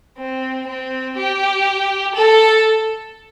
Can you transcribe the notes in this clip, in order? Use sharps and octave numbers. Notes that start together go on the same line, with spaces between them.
C4
C4
G4
A4